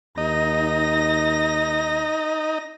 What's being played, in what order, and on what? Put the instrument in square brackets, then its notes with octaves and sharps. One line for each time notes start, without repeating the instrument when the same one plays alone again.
[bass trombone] D#2 [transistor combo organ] D#4 [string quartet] A#6